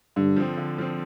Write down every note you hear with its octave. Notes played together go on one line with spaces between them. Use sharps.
G2 D3
F3 C4
D3
F3 C4